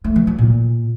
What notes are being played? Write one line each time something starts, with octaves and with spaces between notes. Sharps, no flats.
A3
E3
F#3
A#2